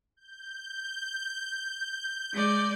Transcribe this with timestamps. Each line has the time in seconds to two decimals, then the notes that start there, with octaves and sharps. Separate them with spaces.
0.17 G6
2.33 G#3 D5